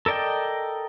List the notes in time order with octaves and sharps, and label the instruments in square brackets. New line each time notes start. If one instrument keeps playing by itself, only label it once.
[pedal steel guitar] A4 A#4 D5 D#5 G5